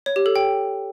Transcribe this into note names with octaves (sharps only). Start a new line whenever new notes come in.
C#5
G4
A4
G5